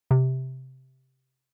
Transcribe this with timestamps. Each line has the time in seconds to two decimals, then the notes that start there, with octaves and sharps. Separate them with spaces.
0.11 C3